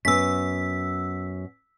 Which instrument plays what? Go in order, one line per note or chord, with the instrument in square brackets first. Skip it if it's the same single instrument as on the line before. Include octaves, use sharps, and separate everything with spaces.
[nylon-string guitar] F#2 B3 [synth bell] E6 B6